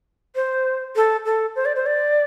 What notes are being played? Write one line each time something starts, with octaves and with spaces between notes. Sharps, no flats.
C5
A4
A4
C5
D5
C5
D5